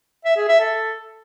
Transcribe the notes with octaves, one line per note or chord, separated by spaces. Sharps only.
E5
G#4
E5
A4